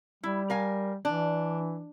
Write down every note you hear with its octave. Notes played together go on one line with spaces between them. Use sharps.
G3 E4
A#4 F5 G#5
E3 D4